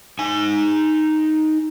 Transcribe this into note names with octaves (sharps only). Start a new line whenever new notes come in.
D#4 G#5